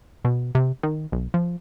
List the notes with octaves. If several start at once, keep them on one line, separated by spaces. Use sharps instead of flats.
B2
C3
D#3
B1
F3